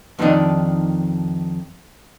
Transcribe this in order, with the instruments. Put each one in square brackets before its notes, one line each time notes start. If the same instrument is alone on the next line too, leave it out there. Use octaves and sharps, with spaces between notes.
[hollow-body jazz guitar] F2 D#3 A#3 B3 D4 D#4